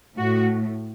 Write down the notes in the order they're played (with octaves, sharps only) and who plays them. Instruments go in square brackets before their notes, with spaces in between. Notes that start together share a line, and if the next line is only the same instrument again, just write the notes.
[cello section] A2 F#4